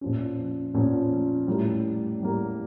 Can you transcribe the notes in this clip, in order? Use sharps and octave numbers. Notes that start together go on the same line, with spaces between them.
A#2 F3 C#4
A#2 F3 C#4
A2 G3 A#3
A2 G3 A#3